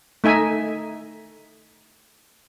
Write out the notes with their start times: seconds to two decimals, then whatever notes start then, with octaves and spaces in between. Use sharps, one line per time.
0.24 A3 D#4 E5 G#5